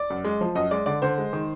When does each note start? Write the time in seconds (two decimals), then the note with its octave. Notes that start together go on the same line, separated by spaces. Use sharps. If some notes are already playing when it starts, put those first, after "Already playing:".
Already playing: D5
0.10 F#2
0.24 G#3
0.41 F3
0.55 F#2 D#5
0.71 G#3 D5
0.86 D3 D5
1.02 D3 C5
1.18 G#3
1.33 D#3